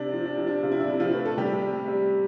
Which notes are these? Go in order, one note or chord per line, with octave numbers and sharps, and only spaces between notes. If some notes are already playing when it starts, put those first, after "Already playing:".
Already playing: C3 D4
F3
D4
F3
D4
C3 F4
E4
D4
C3 E4
F3 F4
A3 B4
A4
C3 G3 G4
G3
G3